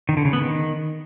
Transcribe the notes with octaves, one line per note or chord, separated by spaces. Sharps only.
D#3
D3
C#3
B3
D#3